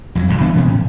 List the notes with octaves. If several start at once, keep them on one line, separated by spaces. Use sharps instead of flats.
F2 D#3 F#3
C2 F2 G#2
E3 B3 D4
C3 F3 B3 C#4
A2